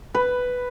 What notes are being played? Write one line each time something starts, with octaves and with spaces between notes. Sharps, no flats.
B4